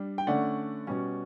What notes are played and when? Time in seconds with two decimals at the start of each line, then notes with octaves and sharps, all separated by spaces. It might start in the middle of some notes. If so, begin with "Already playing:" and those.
Already playing: G3 D4
0.18 G5
0.27 D3 A3 C#4 D5 F#5
0.87 B2 G3 C#4